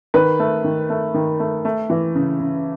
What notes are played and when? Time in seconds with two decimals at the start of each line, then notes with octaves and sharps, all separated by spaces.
0.14 D#3 B4
0.39 A3
0.64 D#3
0.90 A3
1.14 D#3
1.40 A3
1.65 A3
1.90 E3
2.15 C#3
2.40 C#3